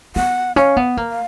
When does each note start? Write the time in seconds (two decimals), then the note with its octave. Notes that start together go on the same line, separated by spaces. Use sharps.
0.16 B3 F#5
0.56 C#4 F5
0.77 B3
0.97 A#3
1.12 F5